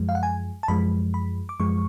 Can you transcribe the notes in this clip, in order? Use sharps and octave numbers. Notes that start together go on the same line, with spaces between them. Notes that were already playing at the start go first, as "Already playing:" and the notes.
Already playing: F#2 F3 G#3
F5
F#5
G#5
A5
F#2 F3 G#3 B5
B5
D6
F#2 F3 G#3 C#6